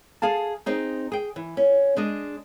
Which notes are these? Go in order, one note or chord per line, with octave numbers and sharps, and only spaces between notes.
G#4 A4 F5 A5
C4 D#4 G#4
G#4 G5
E3
C#4
G#3 D4 D#5